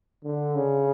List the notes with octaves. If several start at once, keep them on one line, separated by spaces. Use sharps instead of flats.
D3
C#3